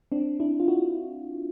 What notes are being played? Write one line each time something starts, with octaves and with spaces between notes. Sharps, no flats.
C4 D4
D4 E4
F4
E4 F#4